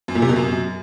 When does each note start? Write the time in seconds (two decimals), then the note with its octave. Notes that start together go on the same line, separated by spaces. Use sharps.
0.08 F#2
0.15 A#2
0.22 C3
0.29 B2
0.36 F#2